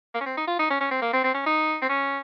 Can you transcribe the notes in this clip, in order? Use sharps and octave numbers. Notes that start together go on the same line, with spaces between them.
A#3
C#4
C4
D#4
F4
D#4
C#4
C#4
C4
A#3
C4
C4
C#4
D#4
C4
C#4